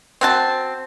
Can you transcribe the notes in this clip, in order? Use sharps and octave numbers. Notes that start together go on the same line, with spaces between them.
C4 F#4 A5